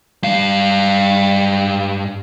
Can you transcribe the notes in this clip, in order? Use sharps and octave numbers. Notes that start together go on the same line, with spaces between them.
G2 F5